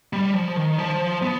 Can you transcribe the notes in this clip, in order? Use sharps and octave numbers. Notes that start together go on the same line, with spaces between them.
G3
F3
D#3
F3
B3